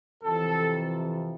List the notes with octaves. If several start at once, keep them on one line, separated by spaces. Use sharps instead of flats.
F2 C3 E3 A4